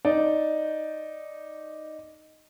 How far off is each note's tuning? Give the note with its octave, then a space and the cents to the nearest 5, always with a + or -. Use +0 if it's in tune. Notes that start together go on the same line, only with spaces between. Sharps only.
D#4 +0 D5 +0